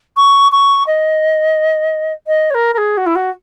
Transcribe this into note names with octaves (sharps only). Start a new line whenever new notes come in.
C#6
C#6
D#5
D#5
C#5
A#4
A#4
G#4
F#4
E4
F#4